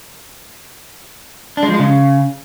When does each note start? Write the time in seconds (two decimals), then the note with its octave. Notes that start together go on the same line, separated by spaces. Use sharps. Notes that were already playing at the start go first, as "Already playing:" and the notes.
1.57 D4
1.63 G#3
1.68 F3
1.74 G#3
1.79 C#3